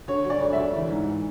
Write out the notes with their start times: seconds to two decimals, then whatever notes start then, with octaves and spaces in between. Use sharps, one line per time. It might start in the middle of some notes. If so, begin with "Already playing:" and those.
0.08 D3 C#5
0.25 F#3
0.30 D5
0.41 D2
0.53 D2 E5
0.74 E3
0.91 G#2